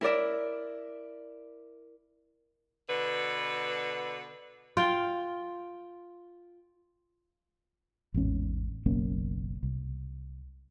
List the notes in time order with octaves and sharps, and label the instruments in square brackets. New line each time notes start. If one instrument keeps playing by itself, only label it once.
[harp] E4 A#4 D5 E5
[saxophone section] B2 D3 B4
[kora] F4 G5
[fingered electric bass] A1 E2 G#2 C#4
F#1 B1 A#3 C#4
C2